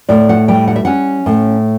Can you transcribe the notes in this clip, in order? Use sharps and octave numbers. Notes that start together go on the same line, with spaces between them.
A2 D5
F#5
G3 G5
F#5
E5
C#4 F#5
A2